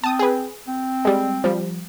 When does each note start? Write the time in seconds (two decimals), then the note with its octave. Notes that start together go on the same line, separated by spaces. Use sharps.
0.04 C4 A5 D#6
0.19 G#4 B4
0.68 C4
1.05 G3 G#3
1.44 F3 G3